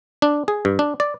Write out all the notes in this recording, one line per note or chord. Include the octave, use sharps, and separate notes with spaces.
D4
G#4
G2
D4
D5